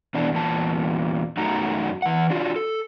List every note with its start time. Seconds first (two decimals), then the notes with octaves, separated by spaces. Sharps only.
0.14 B2 E3 D4
0.32 E2 A#2 A5
1.37 F#2 F#3 A3 D#4 F#4 A#5
2.02 E3 F#5
2.30 D4 F4 F#4
2.56 A4